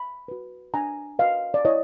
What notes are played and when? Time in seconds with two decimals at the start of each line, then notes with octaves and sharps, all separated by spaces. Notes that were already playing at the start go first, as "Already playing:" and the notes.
Already playing: B5
0.28 F#4 B4
0.74 D4 G#5 A#5
1.19 F#4 B4 D#5 F5
1.54 D5
1.65 E4 C#5 D#5